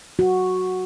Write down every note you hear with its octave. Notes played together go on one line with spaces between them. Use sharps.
F#4